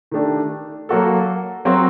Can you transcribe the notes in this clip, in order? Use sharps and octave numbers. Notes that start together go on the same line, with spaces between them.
D#3 A3 D4 G4
F#3 A#3 F#4 A4
F#3 C4 F#4 A#4